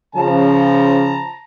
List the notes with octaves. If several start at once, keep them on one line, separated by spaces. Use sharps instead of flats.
C#3 F3 A5 A#5